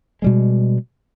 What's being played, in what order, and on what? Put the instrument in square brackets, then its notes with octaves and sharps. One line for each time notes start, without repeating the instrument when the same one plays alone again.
[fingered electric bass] B2 G3 G#3